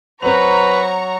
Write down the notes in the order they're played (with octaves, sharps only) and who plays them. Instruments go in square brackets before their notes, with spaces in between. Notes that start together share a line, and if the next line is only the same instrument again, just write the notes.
[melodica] F#3 [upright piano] C4 F7 [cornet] B4 [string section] A#5 C#6